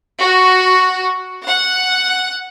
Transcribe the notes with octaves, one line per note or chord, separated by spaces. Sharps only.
F#4
F#5